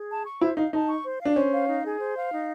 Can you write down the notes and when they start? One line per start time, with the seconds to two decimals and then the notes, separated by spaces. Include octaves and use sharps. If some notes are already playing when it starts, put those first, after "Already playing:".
Already playing: G#4
0.09 A5
0.25 C#6
0.41 E4 C5
0.57 D#4 F5
0.73 D#4 A5
0.89 C#6
1.04 C5
1.20 F5
1.25 D4
1.36 C#4 C5
1.52 F5
1.68 D#4
1.84 G#4
2.00 C5
2.16 F5
2.32 D#4